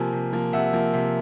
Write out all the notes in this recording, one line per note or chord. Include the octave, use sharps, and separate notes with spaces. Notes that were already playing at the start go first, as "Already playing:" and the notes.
Already playing: C3 F3 A#3 G#5 A#5
C3
F3 A#3
C3 E5 F#5
F3 A#3
C3